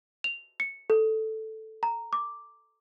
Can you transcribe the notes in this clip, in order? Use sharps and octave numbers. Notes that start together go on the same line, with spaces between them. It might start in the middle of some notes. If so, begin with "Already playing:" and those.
F7
C#7
A4
A#5
D6